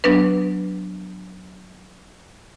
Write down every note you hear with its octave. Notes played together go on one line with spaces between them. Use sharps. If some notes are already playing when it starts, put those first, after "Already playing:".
F#3 B3 D4 B4